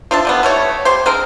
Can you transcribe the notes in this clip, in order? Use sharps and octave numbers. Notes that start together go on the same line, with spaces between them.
F3 D4 E5 A5
D3 G3 B3
G3 A3 C#5
G3 G4 C5
D3 G#3 C4 A#4